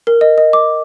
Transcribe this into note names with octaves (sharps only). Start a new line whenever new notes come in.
A#4
D#5
D#5
D6